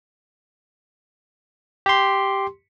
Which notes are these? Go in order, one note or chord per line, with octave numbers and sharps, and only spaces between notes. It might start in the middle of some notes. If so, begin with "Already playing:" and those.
G4 C6